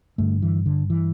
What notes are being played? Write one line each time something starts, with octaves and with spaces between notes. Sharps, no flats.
G2 D3 A3
E3
D3
E3